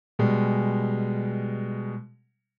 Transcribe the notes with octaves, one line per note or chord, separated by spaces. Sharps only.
B2 G3 G#3